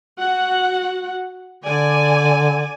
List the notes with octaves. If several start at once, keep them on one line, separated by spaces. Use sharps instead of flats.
F#4 F#5
D3 D5 G#5